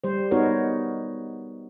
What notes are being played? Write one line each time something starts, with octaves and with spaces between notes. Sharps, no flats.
G3 C5
B3 D#4 F#4 A#4 C#5